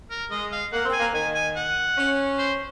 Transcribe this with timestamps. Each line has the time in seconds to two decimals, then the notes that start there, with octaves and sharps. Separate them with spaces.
0.10 A#4
0.31 G#3 D#5
0.52 F5
0.73 A#3 F#5
0.86 C4
0.93 G#5
0.99 A#3
1.14 D#3 G#5
1.34 G#5
1.56 F#5
1.98 C#4
2.38 C5